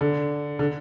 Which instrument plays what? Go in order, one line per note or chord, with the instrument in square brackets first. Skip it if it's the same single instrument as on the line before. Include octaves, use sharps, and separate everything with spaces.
[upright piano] D3
D3